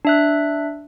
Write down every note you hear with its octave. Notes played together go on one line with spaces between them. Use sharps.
D4 E5 F#6